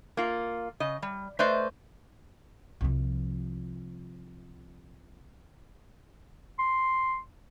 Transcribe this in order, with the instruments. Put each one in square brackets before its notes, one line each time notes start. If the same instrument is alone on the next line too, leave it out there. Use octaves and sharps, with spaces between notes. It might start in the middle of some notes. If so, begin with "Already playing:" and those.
[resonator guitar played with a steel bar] A#3 F4
C#3 D#5
G3
A3 B4 C5 D5 D#5
[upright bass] C2 F3
[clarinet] C6